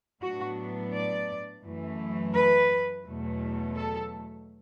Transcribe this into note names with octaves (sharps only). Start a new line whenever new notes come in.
A2 F#3 B3 D4 F#4
D5
F#2 E3 A3
B4
E2 B2 F#3 A3
A4